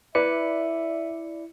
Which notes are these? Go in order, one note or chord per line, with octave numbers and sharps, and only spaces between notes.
E4 B4 D5 E5 C#7